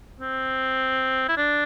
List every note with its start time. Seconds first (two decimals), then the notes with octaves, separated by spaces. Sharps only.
0.21 C4
1.29 E4
1.37 D4